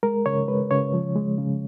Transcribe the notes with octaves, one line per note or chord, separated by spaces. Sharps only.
G#3 A#4
C#3 C#5
G#3 B4
C#3 C#5
F3
G#3
C#3